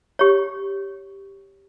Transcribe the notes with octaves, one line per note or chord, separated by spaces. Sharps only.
G4 C#5